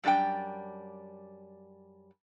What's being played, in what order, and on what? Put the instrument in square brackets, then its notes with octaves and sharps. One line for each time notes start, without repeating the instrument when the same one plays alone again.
[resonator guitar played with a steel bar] F#2 G3 D4 G4 G5